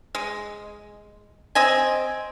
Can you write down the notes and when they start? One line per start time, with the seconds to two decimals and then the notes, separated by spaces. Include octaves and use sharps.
0.15 G#3
1.55 C4 D#5 G#5